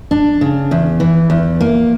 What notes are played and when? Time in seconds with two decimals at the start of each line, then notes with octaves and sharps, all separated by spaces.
0.11 D4
0.41 C#3
0.71 E2
1.00 E3
1.30 E2
1.61 A#3